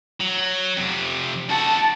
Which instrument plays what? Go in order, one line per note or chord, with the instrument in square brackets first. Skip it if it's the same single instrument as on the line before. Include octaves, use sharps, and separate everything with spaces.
[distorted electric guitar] F#3
F2 C3
[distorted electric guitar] F#4 A4 [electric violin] A5